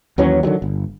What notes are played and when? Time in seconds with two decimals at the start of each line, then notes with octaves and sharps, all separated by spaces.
0.18 D#2 E3 F#3 C#4
0.43 D3 D#3 F#3 G3
0.62 G1